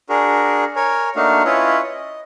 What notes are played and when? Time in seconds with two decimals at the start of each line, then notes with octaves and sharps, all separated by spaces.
0.09 D4 F#4 G#4 A#4
0.76 A#4 C#5 G#5
1.16 A3 A#3 D4 D#4 F#4 F5
1.45 C#4 E4 F4 B4 C#5 D#5
1.83 D#5